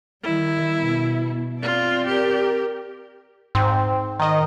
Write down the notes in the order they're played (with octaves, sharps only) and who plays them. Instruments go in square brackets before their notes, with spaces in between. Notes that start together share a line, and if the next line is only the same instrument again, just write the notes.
[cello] D#3 G3 [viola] E4
[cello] B2
[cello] C4 D5 [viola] F4
[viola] G4 A#4
[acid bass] G#2 [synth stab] C4
[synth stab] D#3 D#5